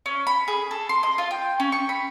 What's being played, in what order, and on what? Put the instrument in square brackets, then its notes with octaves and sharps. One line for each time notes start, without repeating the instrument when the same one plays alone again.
[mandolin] C#4
B5
G#4
A4
C6
D#5
F4
G5
C#4
C#6
B5